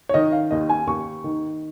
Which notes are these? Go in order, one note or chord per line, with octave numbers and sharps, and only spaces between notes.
C#5
D#3 D#5
F5
D#2 D#5
G#5
D#2 C#6
D#3